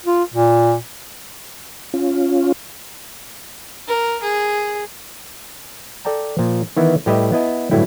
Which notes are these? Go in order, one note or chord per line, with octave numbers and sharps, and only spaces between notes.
F4
A#2
C#4 F4
A#4
G#4
A4 D5 G5 A5 A#5
A#2 F3
D#3 E3 B3 E4
A2 G3 G4 B4 D#5 E5
B3 E4 D#5 A5
G1 A2 D3 F#3 E4 G5